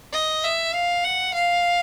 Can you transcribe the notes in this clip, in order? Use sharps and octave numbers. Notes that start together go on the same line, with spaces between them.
D#5
E5
F5
F#5
F5